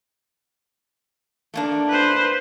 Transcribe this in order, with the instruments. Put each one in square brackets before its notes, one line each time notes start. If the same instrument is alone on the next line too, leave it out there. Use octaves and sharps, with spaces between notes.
[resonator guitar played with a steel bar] A3 A#3 D4
[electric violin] B4 C5